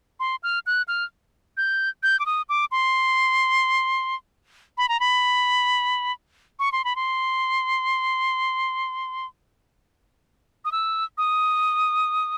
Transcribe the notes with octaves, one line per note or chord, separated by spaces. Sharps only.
C6
F6
F#6
F6
G6
G6
D6
D#6
D6
C6
B5
A#5
B5
C#6
C6
B5
C6
D#6
E6
D#6